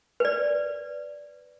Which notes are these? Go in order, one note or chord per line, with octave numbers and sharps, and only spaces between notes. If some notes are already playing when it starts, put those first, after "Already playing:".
B4 D5